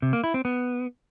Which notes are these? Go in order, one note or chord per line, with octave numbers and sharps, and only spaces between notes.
C3
A#3
E4
C4
B3